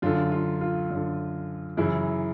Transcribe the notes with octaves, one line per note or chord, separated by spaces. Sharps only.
F#2 D3 F4
F4
F4
F#2 D3
F#2 C#3 E3 E4